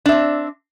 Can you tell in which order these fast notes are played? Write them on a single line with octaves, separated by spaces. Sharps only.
D4 E5 C4